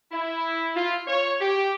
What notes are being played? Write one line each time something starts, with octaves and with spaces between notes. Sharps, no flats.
E4
F4
C#5
G4